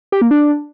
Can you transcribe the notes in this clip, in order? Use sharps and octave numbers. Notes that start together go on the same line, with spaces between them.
G4
A#3
D4